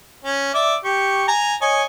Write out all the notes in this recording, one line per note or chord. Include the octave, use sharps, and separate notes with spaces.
C#4
D5 E5 D6
G4 C#6
G#5 A#5
C#5 D#5 G#5